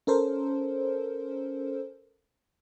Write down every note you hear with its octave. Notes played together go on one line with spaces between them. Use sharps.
C#4 A4 A#4 C5